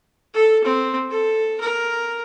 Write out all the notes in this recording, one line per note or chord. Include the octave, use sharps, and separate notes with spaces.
A4
C4
A4
A#4